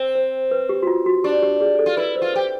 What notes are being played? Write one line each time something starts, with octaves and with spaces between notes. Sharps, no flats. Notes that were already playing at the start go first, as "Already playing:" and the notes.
Already playing: C4
C5
B4
G4
F#4
F4
F#4
D4 G4
G4
G#4
A4
F4
E4 B4
C5
F4 B4
G4 C5